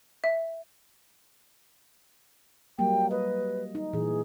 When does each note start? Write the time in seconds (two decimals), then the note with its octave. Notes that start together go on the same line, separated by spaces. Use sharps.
0.24 E5
2.79 F#3 G3 A#3 G5
3.11 B4 D#5
3.75 D#4
3.93 A#2 E3 G#4